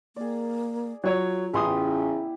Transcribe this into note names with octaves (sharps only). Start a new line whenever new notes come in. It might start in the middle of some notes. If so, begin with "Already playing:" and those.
A#3 G#4 D5
F#3 F4 C#5
A1 C#3 B3 E4 G4 C6 D#6